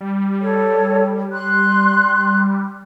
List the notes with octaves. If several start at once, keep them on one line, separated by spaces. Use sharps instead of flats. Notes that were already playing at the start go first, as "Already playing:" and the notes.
G3
A4 C#5
C6 F#6